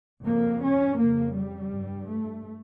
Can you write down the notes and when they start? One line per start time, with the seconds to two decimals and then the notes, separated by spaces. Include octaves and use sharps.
0.24 F2 C#3 A#3
0.61 C#4
0.97 F2 C#3 A#3
1.34 G3
1.70 G2
2.07 A3